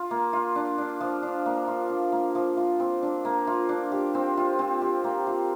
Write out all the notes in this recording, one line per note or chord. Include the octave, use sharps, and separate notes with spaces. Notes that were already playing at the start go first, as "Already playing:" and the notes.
Already playing: F4
A#3
F4
D4
D4
F3
D4
A#3
F4
D4
A#3
F3
F4
C4
D4
A#3
F4
D4
G4
C4
F4
C4
G4
A#3
F4